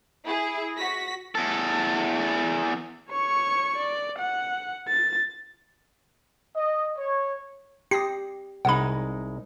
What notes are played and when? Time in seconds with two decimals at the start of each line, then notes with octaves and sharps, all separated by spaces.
0.23 E4 G#4
0.76 F#4 A#6 B6
1.35 E2 A4
3.10 C#5 C#6
3.77 D5
4.19 F#5
4.88 A6
6.56 D#5
6.98 C#5
7.91 G4 D#6 A#6 C7
8.65 C2 G#3 D#4 F#5 B5